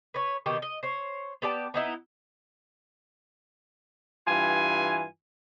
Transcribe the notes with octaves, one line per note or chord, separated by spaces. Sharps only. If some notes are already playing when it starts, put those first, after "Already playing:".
B4 C#5
B2 D#3 G4
D#5
C5 C#5
B3 G4 D5 A5
B3 D#4 E4
G2 E3 F4 G#5